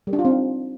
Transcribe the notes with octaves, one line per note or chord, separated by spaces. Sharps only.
G3
D4
F4
C4
D#4